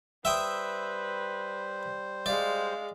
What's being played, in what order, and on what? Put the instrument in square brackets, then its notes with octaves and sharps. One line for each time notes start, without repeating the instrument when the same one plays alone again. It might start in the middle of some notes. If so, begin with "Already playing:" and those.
[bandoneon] G3 C5 [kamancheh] B4 [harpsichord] E5 G5 D#6
[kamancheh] G#3 F5 [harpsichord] D5